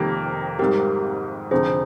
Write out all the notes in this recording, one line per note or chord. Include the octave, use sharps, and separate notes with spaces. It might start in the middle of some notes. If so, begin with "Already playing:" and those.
Already playing: F1 F2 D#3 G3 A#3 G4
G#1 G#2 G3 G4 A#4
F1 F2 D3 G#4 C5